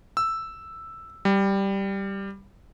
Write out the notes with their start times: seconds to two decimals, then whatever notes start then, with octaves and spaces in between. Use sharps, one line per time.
0.17 E6
1.25 G3